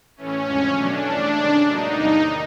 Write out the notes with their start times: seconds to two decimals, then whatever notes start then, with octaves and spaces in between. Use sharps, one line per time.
0.17 A2 E3 A3 C#4
0.46 F2 D3 F3 G#3
0.76 B2 F#3 A3 D4
1.07 G2 E3 A3
1.36 C3 D#3 G#3
1.66 A2 F#3 A#3 D#4
1.95 E2 C3 D#3 G3 A#3